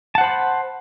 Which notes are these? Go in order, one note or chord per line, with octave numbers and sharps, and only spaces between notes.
C5 F#5 A5 B5